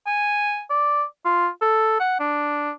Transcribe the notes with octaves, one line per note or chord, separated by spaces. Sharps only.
G#5
D5
F4
A4
F#5
D4